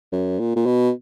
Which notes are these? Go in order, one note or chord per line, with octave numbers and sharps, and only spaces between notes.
F#2
A#2
A#2
B2